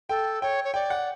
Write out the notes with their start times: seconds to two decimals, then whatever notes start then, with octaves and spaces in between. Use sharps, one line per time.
0.09 A4 G5
0.42 C#5 G5
0.64 C#5
0.74 D5 G5
0.90 F#5